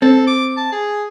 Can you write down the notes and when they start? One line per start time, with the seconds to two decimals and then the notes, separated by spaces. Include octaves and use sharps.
0.02 C4 A4
0.27 D6
0.57 A5
0.72 G#4